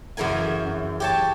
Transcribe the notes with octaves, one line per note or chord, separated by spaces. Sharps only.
F#2 C#3 E3 A#4 G#5
G4 C#5 A5